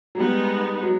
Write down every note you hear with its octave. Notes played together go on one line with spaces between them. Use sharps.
F#3
G3 G#3 B3 D#4
F#3